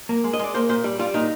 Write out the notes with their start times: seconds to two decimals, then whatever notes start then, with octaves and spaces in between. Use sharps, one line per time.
0.09 A#3
0.24 G#3
0.33 D#5
0.39 G#3 D5
0.54 A#3 C5
0.69 A#2 C5
0.84 G3
0.99 G3 F4
1.14 A#2 D#4